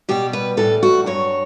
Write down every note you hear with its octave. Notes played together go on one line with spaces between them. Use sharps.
B2 G3 G4
B4
A2 E3 G3 A4
F#4
G2 F#3 C#5